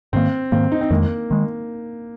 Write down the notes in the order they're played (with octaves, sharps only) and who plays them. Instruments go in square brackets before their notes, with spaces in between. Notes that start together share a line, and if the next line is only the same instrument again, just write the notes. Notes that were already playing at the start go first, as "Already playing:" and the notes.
[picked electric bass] G#2 D#3 A#3 [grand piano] C4
[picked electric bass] G#2 D#3 A#3 [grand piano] C4
[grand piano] D#4
C4
[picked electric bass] F2 D#3 G#3 [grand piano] A#3
[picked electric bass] D#3 G#3